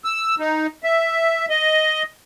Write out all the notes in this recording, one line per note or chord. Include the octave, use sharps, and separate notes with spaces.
E6
D#4
E5
D#5